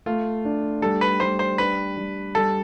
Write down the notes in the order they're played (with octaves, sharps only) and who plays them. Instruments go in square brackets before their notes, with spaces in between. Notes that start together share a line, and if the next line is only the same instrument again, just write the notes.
[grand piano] A3 [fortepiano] F4
[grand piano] D4
[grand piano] G3 [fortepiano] A4
[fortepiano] B4
[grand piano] G3 [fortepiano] C5
[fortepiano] C5
[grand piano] D4 [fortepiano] B4
[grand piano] G3
[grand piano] G3 [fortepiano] A4